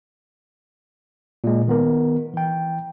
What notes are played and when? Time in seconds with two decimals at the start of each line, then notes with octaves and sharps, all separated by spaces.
1.44 A#2 G#3
1.68 D#3 B3 A#4
2.34 E3 G5